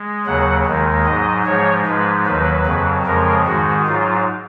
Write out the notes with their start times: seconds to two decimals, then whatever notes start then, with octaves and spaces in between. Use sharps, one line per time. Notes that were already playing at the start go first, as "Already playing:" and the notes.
Already playing: G#3
0.26 D#2 C#3 F#3 F#5
0.66 D#2 D#3 G#3
1.06 G#2 F#3 D#5
1.46 G#2 F3 G#3 C#5
1.86 G#2 F3 G#3 B4
2.26 D#2 D#3 F#3 B4
2.66 F2 C#3 F#3
3.06 F2 C#3 F3 G#3 A#4
3.46 G#2 D#3 G#3 F#4
3.86 G#2 F#3 F4